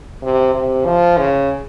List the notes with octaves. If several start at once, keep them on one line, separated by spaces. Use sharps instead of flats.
C3
C3
F3
C#3